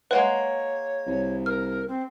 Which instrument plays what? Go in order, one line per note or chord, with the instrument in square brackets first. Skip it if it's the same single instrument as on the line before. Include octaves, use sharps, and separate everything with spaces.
[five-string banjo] G#3 A#3 F#5 [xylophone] B4 [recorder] C#5
[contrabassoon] C2
[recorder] A#4 [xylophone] F6
[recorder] C4